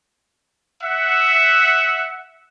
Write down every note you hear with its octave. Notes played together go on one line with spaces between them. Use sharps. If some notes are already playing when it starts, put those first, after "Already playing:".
E5 F#5